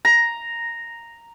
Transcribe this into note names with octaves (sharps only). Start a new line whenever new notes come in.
A#5